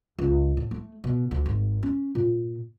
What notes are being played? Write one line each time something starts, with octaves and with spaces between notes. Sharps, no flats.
C#2
A2
A3
B2
D2
G#1
C#4
A#2